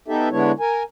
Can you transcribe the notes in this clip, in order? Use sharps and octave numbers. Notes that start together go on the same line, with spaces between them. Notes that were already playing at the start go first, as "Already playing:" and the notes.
B3 D#4 G4 A4 E5
D3 G#3 B3 D4 E4 C#5
A#4 G#5